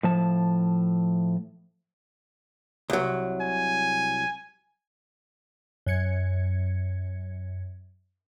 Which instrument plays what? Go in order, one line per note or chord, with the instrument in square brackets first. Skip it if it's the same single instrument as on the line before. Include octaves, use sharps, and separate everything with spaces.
[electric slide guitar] A2 F3 A5
[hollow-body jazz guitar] C2 F#3
[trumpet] G#5
[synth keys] F#2 G#6 C#7